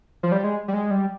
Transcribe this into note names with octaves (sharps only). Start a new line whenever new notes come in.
F3
G3
G#3
G3
G#3
G3